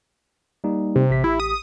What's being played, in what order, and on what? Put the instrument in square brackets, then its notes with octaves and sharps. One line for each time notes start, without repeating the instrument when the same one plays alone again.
[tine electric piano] G3 A#3 D#4
[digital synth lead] C3
[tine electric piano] A1 G4 B6
[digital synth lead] E4
D#6